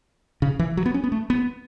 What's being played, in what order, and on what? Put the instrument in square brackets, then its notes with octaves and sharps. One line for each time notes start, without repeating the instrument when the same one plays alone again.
[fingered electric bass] C#3
E3
F#3
B3
C#4
B3
A3
B3